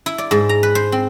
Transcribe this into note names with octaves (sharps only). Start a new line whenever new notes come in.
E4
D5
G#2
A#5
B4
C5
C4